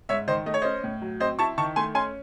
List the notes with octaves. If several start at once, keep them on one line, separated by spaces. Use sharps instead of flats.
G#2 C#5 E5
D#3 C5 D#5
A3 D#5
C#5
C#4 C5 D#5
A2
F#3
C4 C5 D#5
E4 A5 C#6
D#3 A5 C#6
A3 G#5 C6
C#4 G#5 C6